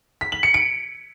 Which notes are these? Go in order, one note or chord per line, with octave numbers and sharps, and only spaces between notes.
B6
F#7
C#7
D7